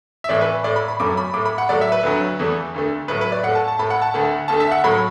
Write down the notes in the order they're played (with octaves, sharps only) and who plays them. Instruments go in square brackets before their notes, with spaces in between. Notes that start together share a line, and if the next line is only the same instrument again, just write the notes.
[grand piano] E5
A2 E3 A3 D5
B4
A2 A3 D5
B5
B5
F#2 F#3 A3 D6
B5
A2 A3 D6
B5
F#5
A2 F#3 A3 D5
E5
B4
D2 D3 F#3
E2 E3 A3
D2 D3 A3
A2 F#3 A3 B4
B4
D5
A2 F#5
A3
A5
A5
A2 A3 B5
F#5
A5
D2 D3 A3 F#5
D2 D3 A3 A5
E5
F#5
A2 F#3 A3 B5